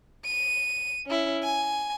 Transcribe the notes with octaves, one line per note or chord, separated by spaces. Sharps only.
D#7
C#4 E4
G#5